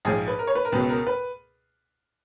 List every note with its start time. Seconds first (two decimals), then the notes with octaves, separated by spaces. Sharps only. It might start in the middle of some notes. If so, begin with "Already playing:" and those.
0.05 A#1 G#2 F3 G#4
0.28 B4
0.39 A#4
0.47 C#5
0.55 B4
0.65 A#4
0.72 C#2 B2 F#3 B4
0.89 A#4
1.07 B4